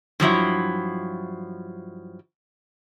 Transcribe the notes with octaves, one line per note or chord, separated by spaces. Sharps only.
G2 F3 F#3 E4